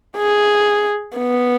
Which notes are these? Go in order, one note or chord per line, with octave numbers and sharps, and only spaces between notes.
G#4
B3